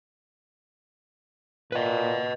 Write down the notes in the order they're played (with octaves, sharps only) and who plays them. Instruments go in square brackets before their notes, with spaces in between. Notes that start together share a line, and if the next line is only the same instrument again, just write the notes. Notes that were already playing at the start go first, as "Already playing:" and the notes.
[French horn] A#2 [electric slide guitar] B4 D#5